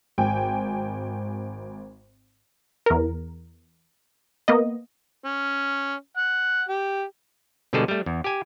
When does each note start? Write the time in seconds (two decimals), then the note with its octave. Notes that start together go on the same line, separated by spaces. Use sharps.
0.18 G#1 G5 G#5
2.86 E2 A#4
4.48 A#3 B3 D#5
5.25 C#4
6.17 F#5
6.69 G4
7.73 B2 D3 G3 G#3 G#4 A4
7.88 G3 A3
8.06 E2
8.24 G4 G#5